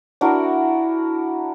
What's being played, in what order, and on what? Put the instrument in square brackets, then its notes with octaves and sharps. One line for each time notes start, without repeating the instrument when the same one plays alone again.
[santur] D4 E4 F#4 A#4